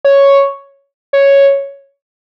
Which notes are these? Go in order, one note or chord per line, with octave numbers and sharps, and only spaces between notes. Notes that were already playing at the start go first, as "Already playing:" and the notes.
C#5
C#5